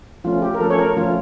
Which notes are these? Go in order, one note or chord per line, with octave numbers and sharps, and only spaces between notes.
F3 A3 C#4 F4
G4
A#4
F3 A3 C#4 A4
C#5
A#4
F3 A3 C#4 F4